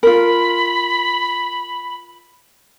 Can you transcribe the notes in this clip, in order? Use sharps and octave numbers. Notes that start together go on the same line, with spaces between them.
F4 A#4 B5